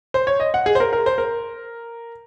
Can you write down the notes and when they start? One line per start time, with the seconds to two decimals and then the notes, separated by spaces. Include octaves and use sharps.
0.14 C5
0.27 C#5
0.40 D#5
0.54 F#5
0.66 G#4
0.75 C5
0.80 A#4
0.93 A#4
1.06 C5
1.18 A#4